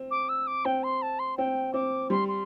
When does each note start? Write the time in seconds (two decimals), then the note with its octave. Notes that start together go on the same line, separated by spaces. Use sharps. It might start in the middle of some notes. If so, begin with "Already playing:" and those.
Already playing: C4
0.11 D6
0.29 E6
0.47 D6
0.65 C4 G5
0.83 C6
1.02 A5
1.19 C6
1.37 C4 G5
1.74 C4 D6
2.10 G3 C6
2.28 C6